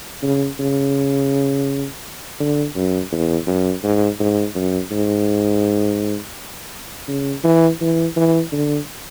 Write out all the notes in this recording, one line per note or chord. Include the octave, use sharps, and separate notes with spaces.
C#3
C#3
D3
F#2
E2
F#2
G#2
G#2
F#2
G#2
C#3
E3
E3
E3
D3